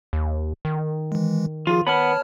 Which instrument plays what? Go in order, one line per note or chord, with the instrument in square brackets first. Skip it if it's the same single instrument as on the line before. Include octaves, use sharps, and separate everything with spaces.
[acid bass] D#2
D#3
[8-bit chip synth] E3 G#3
[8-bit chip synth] F3 G#4 [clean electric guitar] F4
[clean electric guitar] B3 B5 [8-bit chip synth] C#5 A5 F6